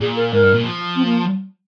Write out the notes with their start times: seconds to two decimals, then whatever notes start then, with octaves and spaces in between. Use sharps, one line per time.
0.01 A#2 G#4
0.16 A#4
0.33 G#2 A#4
0.43 G2
0.54 A#2
0.63 F3
0.96 C4
1.05 A#3